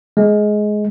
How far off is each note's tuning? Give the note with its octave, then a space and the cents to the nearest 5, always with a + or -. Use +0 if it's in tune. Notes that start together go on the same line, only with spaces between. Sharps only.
G#3 +15